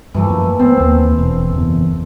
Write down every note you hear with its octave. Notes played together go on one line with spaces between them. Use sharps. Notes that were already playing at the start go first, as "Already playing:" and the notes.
G2 E3 F3 A3 A#3
F#2
B3 C4 A5
D#2 A#3
E1
F#1 E2